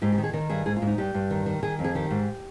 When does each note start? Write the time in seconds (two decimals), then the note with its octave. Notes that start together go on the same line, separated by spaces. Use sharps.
0.02 G#2 G4
0.12 G4
0.18 D#3
0.23 G#4
0.33 D#3 A#4
0.50 G2 G#4
0.66 G#2 G#4
0.76 F4
0.82 G#2
0.87 D#4
0.98 G2 G4
1.14 G2
1.31 D#3
1.46 D#3
1.63 D#3 G#4
1.79 F2
1.84 G#4
1.95 D#3 G4
2.11 G#2